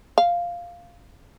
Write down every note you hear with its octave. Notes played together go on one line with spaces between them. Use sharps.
F5